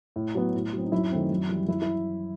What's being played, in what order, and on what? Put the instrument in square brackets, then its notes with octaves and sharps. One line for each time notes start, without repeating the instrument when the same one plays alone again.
[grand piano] A2
F#3 B3
A2
F#3 C4
D#4
F#2 E4
D#3 A3 C4
F#2
E3 G3
F#2 E4
E4